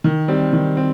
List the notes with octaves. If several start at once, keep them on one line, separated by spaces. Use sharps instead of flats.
D#3
G3 C4
D#3
C4